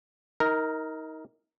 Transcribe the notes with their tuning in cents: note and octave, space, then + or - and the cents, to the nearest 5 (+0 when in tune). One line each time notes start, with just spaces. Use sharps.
D#4 +25 A#4 +0